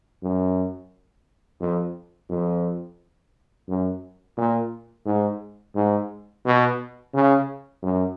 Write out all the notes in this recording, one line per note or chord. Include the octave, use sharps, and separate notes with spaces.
F#2
F2
F2
F#2
A#2
G#2
G#2
B2
C#3
F#2